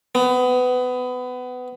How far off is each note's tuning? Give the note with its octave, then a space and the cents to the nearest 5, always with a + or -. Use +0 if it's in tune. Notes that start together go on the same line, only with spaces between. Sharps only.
B3 +25